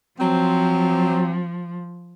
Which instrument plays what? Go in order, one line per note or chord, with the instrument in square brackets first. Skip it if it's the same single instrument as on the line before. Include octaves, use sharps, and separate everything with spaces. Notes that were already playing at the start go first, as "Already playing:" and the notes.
[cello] F3 [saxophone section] F#3 C4